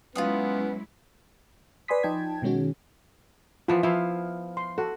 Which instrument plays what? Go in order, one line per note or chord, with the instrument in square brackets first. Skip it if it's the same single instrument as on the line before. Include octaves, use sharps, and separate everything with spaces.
[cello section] F#3 G#3 E4 [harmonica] B3 [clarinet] C#4 [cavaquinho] F4 F#5 D#6
[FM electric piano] B4 D5 G#5 C6 D#6 B6
F3 D#4 G5 A5 G#6
B2 D#3 G#3 C#4 F#4
[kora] E3 F3 B3 [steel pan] F4 A5
[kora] F3 E4 F5 [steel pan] E5
[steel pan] C6
[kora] F#4 [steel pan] A4